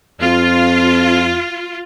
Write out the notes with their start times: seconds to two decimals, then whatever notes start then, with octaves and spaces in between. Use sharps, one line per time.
0.21 F2 F4